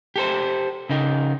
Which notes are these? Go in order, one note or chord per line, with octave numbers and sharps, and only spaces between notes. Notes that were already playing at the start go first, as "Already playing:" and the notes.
G4 A4 C5
C#3 D#4 G4